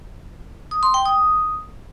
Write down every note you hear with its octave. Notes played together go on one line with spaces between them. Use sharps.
D#6
C6
G5
D#6